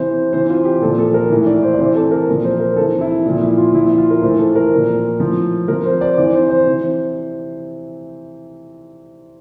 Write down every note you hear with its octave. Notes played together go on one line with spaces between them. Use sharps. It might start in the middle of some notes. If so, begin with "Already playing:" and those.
Already playing: C3 E3 C5
C3 E3 C5
F4
G4
A#2 F3 A4
A4
A#4
A2 E3
D5
C5
D5
C3 E3 C5
A4
A#4
A#2 F3
C5
A#4
C3 E3 A4
E4
A#2 F3
E4
F4
A#2 F3 E4
E4
F4
A#4
A2 E3 C5
A4
A#4
A#2 F3
A2 F3
C3 F3 A#4
C5
D5
C3 E3 D5
C5
C5
C3 E3